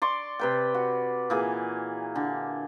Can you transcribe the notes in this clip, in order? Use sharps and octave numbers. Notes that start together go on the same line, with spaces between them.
D5 C6 C#6
C3 B4 G5
F#4
A#2 E3 G#4
D3